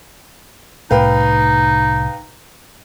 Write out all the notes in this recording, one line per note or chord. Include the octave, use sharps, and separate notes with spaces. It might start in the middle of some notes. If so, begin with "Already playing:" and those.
C2 A2 A3 D#4 B4 F5 G5